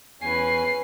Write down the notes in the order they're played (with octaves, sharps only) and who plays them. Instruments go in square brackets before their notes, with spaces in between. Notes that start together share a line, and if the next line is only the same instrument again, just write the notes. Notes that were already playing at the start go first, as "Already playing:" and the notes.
[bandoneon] E2 G#5 [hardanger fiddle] C#4 B4 [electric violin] C7